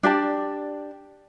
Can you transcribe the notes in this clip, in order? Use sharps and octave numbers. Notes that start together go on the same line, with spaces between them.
D4 G4 D5 A5